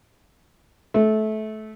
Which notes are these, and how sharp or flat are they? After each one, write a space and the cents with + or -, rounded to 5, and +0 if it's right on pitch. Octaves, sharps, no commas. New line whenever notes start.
A3 -20